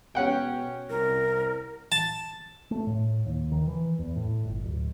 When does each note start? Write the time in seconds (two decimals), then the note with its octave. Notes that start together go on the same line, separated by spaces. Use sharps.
0.15 B2 C#4 F#5 G5
0.90 C2 A#4
1.92 A5
2.71 A3
2.87 A2
3.26 D#2
3.52 D#3
3.68 E3
3.99 E2
4.16 A2
4.44 G1
4.64 D1